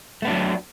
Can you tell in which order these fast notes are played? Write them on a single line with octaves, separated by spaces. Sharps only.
A3 B3 D4 F#3